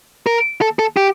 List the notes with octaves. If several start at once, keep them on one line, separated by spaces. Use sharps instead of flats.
A#4
A4
A4
G4